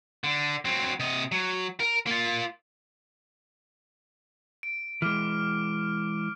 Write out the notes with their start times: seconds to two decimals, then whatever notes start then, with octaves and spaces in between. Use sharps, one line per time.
0.24 D3
0.65 F#3 C4
1.00 C3 D#5
1.32 F#3
1.80 A#4
2.06 A#3 F4
4.63 D7
5.02 E3 G#3 D6 F6